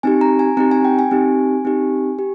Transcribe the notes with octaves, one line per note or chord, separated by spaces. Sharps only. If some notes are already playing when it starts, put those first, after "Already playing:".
C4 D#4 G4 G#5
A#5
G#5
C4 D#4 G4 A#5
G#5
G5
G#5
C4 D#4 G4
C4 D#4 G4
G4